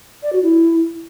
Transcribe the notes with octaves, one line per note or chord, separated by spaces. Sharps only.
D5
F#4
E4